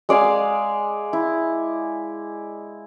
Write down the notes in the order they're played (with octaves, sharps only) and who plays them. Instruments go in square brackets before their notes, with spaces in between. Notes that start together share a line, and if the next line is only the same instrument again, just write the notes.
[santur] G#3 D5 F5 G#5
E4